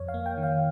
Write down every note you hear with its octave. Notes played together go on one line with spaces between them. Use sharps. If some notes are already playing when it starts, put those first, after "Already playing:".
Already playing: F2 C#5
F5
A#3
G5
D#3
F5